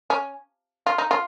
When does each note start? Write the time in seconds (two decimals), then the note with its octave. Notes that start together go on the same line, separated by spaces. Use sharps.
0.10 C#4
0.87 F4
0.98 D#4
1.11 F4